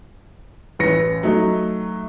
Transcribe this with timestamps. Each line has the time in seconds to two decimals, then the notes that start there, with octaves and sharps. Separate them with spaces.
0.79 A1 B4 A#6 C#7
1.23 F#3 A3 D#4